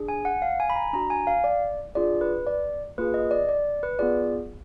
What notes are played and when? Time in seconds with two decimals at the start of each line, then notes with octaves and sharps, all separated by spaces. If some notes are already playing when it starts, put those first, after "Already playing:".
Already playing: D4 G#4
0.09 G#5
0.25 F#5
0.42 F5
0.60 G#5
0.70 B5
0.76 A#5
0.93 D4 F#4 A#5
1.10 G#5
1.27 F5
1.44 D5
1.95 D4 F4 G#4 D5
2.21 B4
2.47 D5
2.98 A#3 F4 G#4 B4
3.14 D#5
3.31 D5
3.49 D5
3.83 B4
3.99 B3 F4 G#4 D5